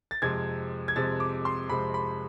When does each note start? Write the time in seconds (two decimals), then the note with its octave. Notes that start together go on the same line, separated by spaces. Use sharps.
0.11 A6
0.22 F2 C3 G#3 C4 G#6
0.88 G#6
0.96 F2 C3 G#3 C4 A6
1.20 D6
1.45 C6
1.69 F2 C3 G#3 C4 B5
1.94 B5